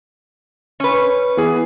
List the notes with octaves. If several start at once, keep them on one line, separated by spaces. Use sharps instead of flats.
C#4 B4
E3 B3 G#4